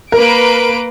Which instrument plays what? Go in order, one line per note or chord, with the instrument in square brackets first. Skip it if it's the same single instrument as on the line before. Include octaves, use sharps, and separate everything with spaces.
[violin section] A#3 B4 D7 [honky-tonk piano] A#4